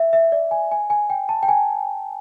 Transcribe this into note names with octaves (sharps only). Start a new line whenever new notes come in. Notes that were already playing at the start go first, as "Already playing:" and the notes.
Already playing: E5
E5
D5
G#5
G#5
G#5
G5
A5
G5
G#5